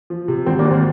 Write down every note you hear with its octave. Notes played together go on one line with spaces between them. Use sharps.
F3
C3
G#1 C4
A#3 D4
G#1
C4